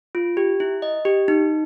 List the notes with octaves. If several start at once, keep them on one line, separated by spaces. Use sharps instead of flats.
F4
G4
E4
D#5
G4
D#4